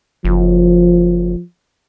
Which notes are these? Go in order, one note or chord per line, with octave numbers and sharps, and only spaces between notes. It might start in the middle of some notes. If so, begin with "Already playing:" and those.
F#1 F3